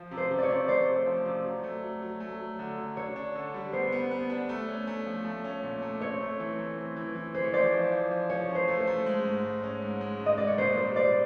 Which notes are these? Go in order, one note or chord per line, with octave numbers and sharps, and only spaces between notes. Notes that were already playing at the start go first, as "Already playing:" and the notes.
Already playing: F3
C3
C5
C3
C#5 D5
C3
C3 C5 D5
A3
F3
C3
F#3
A3
F#3
F#3
A3
F#3
D3
F#3
D4 C#5
D4
D3
G3
B3 C5
B3
B3
D4
A3
C#4
A3
F3
A3
C#4
A#2
A3
C4 C#5
A3
E3
A3
C4
E3
E3
E3 C5
C#5
F3 C5 D5
F3
F3
F3
F3 C#5
C#4
C5
A3
C5
A3
G#3
G#2
G#2
C#4
G#2
G#3
G#2
D#5
G#3 D5
C#5
A#2 C5
G3 C5
A#2 C5 D5